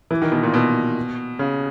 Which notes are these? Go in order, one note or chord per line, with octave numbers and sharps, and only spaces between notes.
E3
D#3
B2
A#2
B2
C#3